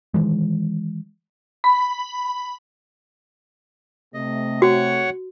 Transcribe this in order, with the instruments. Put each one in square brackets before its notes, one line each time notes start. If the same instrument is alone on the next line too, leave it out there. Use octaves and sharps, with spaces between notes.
[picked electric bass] D#3 E3 G#3
[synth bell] B5
[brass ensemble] C3 A3 [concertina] D#5
[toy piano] F#4 [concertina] C#5 F#5 C#6